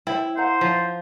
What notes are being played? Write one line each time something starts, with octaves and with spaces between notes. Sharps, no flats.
E4 C5 E5 G5
C5 F5 F#5 A#5
F3